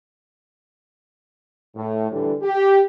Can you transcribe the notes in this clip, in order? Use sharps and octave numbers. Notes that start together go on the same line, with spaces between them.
A2
D3 E3 G3 D4 A4
G4